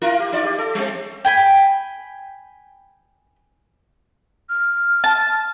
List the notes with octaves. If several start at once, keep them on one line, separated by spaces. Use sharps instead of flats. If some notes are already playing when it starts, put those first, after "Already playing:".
E4 F4 A#4
G4
D#4 F4 D5
G4
A4
G3 C4
G5 G#5 B5
F6
A5